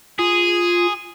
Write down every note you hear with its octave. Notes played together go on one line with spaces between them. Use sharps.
F4 G#4